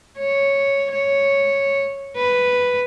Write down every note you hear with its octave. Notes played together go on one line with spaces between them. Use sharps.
C#5
C#5
B4